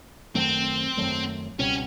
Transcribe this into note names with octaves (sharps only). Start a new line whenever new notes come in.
F#2 D#3 F#3 A3 C4
F#2 D#3 F#3 A3
C#2 B2 G3 C4 C#4